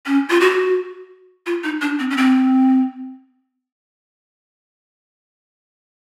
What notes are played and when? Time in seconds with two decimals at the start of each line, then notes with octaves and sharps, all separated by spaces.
0.06 C#4
0.30 F4
0.41 F#4
1.46 F4
1.64 D#4
1.82 D4
1.99 C4
2.10 C#4
2.17 C4